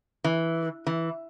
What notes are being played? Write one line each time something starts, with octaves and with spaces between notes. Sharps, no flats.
E3
E3